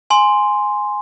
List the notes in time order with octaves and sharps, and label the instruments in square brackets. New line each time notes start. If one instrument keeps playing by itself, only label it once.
[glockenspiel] G#5 C6